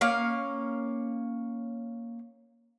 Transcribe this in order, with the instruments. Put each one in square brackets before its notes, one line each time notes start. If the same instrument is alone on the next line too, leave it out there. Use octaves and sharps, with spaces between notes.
[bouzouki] A#3 C#4 F5